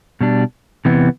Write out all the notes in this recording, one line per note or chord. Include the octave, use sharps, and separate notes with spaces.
B2 G3 D4
C3 E3 B3